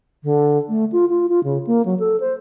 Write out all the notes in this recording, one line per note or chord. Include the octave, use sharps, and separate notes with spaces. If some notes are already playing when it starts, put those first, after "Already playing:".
D3
A3
F4
F4
F4
C#3
A#3
F#3
A4
C5